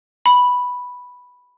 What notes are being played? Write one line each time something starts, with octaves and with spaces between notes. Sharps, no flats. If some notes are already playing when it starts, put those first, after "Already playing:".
B5